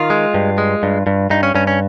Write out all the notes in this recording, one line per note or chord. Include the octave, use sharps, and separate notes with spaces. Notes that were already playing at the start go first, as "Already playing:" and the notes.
Already playing: D#3 F4
G#3
G2
G#3
G2
G2
G2 D#4
C#4
G2 C#4
C#4